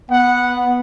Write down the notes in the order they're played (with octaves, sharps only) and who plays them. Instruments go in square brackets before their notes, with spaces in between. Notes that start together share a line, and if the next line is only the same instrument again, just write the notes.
[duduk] B3 [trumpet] F#5